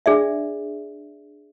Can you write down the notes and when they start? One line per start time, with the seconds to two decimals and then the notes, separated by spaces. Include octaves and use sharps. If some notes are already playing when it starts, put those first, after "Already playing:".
0.06 D4 G#4 D5 E5